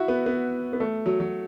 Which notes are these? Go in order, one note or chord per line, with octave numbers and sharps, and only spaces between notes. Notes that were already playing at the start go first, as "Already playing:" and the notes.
Already playing: E4 F#4
B3
B3
B3
A3
F#3
F#3